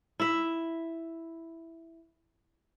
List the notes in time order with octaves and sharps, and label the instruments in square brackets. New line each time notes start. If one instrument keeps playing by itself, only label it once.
[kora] E4 E5